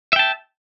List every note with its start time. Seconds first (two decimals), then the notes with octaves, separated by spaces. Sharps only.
0.13 E5
0.16 G5
0.19 A5